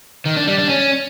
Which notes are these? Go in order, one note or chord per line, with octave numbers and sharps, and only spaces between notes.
D#3
D4
G3
D4
C#4